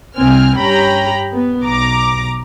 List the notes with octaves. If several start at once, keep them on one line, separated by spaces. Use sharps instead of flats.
C2 C4 G#5 F6
G2 C#4 G4 G5 A#5 B5
B3
B1 A#5 D6